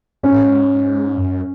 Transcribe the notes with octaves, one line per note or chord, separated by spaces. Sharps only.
G#2 C#4
A2
G#2
F#2